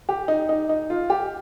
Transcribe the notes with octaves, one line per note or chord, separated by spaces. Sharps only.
G4
D#4
D#4
D#4
F4
G4